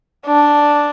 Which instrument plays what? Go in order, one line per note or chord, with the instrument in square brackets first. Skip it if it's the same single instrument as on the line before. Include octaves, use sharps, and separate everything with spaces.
[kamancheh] D4